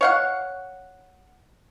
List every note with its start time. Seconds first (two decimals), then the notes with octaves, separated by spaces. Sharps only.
0.01 C#5 F5 F#5